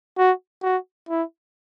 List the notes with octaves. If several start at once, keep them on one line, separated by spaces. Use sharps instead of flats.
F#4
F#4
E4